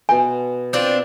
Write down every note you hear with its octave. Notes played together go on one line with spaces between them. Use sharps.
B2 G#5 C6
C4 D4 F4